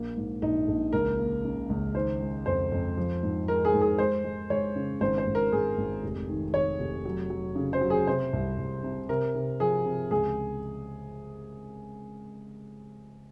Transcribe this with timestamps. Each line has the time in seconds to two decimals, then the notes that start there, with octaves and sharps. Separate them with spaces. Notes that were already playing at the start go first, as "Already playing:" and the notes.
Already playing: A#1 A#3
0.17 G#2
0.42 A#1 D#4
0.68 A#1
0.93 C#2 A#4
1.19 A#3
1.44 C#3
1.70 C#2
1.95 D#3 C5
2.20 G#3
2.46 F2 C5
2.72 F2
2.97 F3
3.23 G#2
3.48 G#3 A#4
3.65 G#4
3.73 G#2
3.81 G#4
3.98 G#3 C5
4.24 G#3
4.50 G#3 C#5
4.76 C#3
5.01 G#1 C5
5.18 C5
5.26 G#1
5.35 A#4
5.52 G#1 G#4
5.78 G#1
6.03 F1
6.29 D#3
6.54 D#3 C#5
6.79 F1
7.05 F#3
7.30 F#3
7.55 C#3
7.73 C5
7.81 F#3
7.90 G#4
8.07 C3 C5
8.33 C2
8.58 C2
8.84 C3
9.09 C3 A#4
9.35 C3
9.60 F3 G#4
9.86 C3
10.11 C#2 G#4